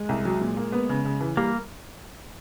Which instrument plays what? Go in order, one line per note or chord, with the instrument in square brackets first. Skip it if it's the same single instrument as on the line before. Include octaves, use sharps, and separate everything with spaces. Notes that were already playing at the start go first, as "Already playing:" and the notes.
Already playing: [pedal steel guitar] G#3
[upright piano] C2
F#3
A#2
A#3
B3
C#3
C#3
E3
[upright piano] G3 [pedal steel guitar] A#3